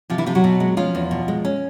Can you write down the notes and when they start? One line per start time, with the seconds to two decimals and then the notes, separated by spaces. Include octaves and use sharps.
0.10 C3 F3 F4
0.18 E3 E4
0.26 C3 F3 F4
0.35 F#3 F#4
0.44 B2
0.60 G#3
0.77 F3 C#4 F4
0.95 E2
1.11 B2
1.28 G#3
1.45 C#4